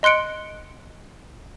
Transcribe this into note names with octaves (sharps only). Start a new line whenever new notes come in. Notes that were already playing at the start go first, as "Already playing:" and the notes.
D#5 C6 F#6 C#7 D7